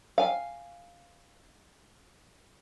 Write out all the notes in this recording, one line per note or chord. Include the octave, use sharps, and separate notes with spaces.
F5 G#5